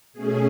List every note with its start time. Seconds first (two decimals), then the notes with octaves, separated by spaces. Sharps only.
0.13 B2 A3 C#4 G#4